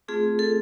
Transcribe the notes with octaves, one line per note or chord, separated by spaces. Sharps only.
A3 C4 F4 G#4
A4